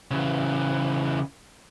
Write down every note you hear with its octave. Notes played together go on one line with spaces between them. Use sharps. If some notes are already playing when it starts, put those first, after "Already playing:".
C#3 E3